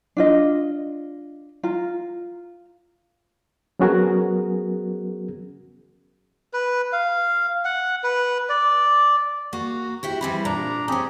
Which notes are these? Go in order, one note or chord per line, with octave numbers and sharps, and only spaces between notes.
D4 F4 D#5
F4 A#5
F#3 B3 C#4 F#4 G#4 A#4
B4
F5
F#5
B4
D5
A#3 F#4
E4 F#4 G4
E3 G3 C4 B5
A#2 D4 A#5
C4 C#4 G4 G#4